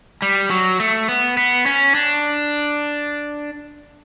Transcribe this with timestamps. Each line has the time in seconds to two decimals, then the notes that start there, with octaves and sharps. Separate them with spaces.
0.22 G3
0.50 F#3
0.80 A3
1.08 B3
1.37 B3
1.66 C#4
1.95 D4